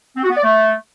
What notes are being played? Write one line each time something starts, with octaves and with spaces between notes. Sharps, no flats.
C4
F#4
B3
D5
A3